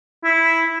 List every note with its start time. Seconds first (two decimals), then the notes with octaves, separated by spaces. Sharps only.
0.24 E4